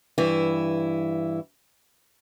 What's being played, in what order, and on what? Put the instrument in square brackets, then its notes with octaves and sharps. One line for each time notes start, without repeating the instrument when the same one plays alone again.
[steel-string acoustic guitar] G2 E3 E4